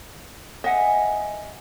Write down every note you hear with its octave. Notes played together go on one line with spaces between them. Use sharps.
D#5 E5 F#5 G#5